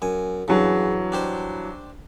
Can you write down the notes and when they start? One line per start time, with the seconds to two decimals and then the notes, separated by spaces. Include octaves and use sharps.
0.02 F#2 G#5
0.48 G2 C#3 E3 F#3
1.12 D4 G4 C5